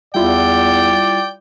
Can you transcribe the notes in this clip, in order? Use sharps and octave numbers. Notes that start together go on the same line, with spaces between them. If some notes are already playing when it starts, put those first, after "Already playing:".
E2 G3 E4 F4 D5 G5